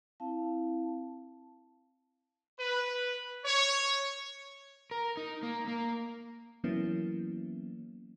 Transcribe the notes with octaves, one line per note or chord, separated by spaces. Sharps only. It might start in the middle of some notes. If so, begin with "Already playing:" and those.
C4 E4 F5 A5
B4
C#5
A#4
D#4
A#3
A#3
E3 F#3 A#3 B3 C#4 E4